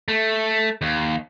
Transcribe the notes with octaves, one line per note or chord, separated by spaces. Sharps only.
A3
D#2